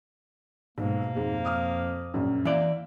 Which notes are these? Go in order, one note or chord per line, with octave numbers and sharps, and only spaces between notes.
B1 G#2 B2 A#3
F2 G#2 G#3
D6 D#6 F6
A#1 F#2 C#3
E3 A#3 D5 E5